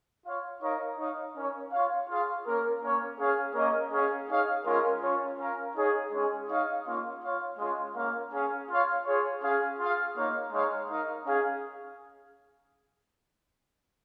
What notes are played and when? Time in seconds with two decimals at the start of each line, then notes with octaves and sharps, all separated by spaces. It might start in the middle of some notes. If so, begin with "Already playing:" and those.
0.25 F4 C#5 F5
0.62 D#4 A#4 C#5 F5
0.98 D#4 C#5 F5
1.35 C#4 A#4 C#5
1.72 F4 C#5 F5
2.09 F4 G#4 F5
2.46 A#3 C#4 A#4
2.82 A#3 C#4 A#4 C#5
3.19 C#4 G#4 C#5 F5
3.55 A#3 C#4 A#4 D#5
3.92 C#4 G#4 C#5 F5
4.29 D#4 G#4 C#5 F5
4.65 G#3 C#4 F4 A#4
5.02 C#4 F4 C#5 F5
5.39 C#4 A#4 F5
5.76 D#4 G#4 C#5 F5
6.13 G#3 C#4 G#4
6.49 D#4 C#5 F5
6.86 A#3 C#4 F4 C#5 F5
7.23 F4 C#5 F5
7.58 G#3 C#4 F4 G#4
7.95 A#3 C#4 A#4 F5
8.32 C#4 G#4 F5
8.70 F4 C#5 F5
9.05 F4 G#4 C#5
9.43 C#4 G#4 F5
9.79 F4 G#4 F5
10.16 A#3 D#4 C#5 F5
10.52 G#3 D#4 C#5 F5
10.89 D#4 A#4 F5
11.25 C#4 G#4 F5